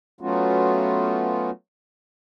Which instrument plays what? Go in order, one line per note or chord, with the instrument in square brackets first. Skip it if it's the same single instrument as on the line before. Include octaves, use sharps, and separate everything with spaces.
[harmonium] F#3 A3 B3 C#4 F4 F#4